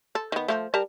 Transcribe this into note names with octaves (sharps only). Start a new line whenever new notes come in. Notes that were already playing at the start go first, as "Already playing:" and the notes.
A4
D#3 B3
F3 A3
G3 A#4 A5